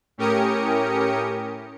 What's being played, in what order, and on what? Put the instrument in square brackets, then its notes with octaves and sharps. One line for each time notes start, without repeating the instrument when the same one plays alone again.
[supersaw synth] A2 C#4 G4 A#4 D#6 C#7